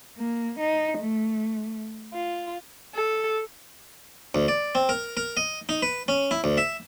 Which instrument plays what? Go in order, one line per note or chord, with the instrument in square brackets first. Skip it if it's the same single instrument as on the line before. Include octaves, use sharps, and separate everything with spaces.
[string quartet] A#3
D#4
A3
F4
[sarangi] A4
[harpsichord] D2
D5
C4
A#4
A#4
D#5
D#4
B4
C#4
E4
D2
E5